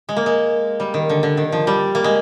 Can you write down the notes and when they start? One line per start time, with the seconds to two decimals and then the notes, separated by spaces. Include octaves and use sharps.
0.09 G#3
0.16 A#3
0.26 G#3
0.80 G3
0.94 D#3
1.09 D3
1.23 D3
1.37 D#3
1.52 F3
1.67 G3
1.95 A#3
2.04 G#3